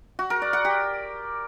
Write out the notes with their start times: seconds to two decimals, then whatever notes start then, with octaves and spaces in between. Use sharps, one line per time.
0.19 F#4
0.30 A#4
0.42 D5
0.53 F#5
0.65 G4